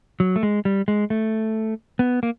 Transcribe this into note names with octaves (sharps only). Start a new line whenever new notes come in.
F#3
A3
G#3
G3
G#3
A3
B3
A#3